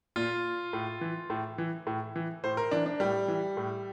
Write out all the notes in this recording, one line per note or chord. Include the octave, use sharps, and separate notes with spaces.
A#2 F4
A2
E3
A2
E3
A2
E3
A2 C5
A#4
E3 D4
D4
A2 G3
E3
A2